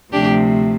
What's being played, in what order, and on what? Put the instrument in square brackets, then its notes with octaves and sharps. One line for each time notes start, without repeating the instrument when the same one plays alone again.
[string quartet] D2 C3 F3 A3 D4 G4